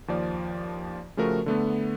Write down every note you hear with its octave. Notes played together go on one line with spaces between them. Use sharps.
D#2 F3 D5
C#3 F3 A3 F#4 A#4
D3 A3 B3